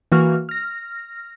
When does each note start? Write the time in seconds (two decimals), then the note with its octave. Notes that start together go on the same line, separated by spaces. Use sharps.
0.12 E3 A#3 F#4 F6
0.49 F6 A#6